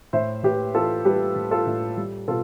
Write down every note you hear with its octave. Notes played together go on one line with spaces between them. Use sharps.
A2 C5 E5
A2 G4 B4
E3 F4 A4
G3 G4 B4
A2
F4 A4
A2
G3
B2 F4 A4